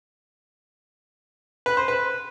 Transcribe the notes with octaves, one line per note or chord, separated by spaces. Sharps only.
B4
C5
B4